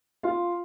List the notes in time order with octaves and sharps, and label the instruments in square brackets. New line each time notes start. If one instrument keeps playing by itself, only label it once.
[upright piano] F4 F5